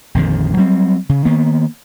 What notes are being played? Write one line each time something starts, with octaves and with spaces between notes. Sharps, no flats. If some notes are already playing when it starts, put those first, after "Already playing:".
A#1 F2 D3 D#3
F#3 G3 A#3 C4
C#3
D#3 A#3 B3